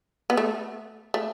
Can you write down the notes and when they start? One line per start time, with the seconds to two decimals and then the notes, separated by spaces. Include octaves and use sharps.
0.30 B3
0.37 A3
1.14 A3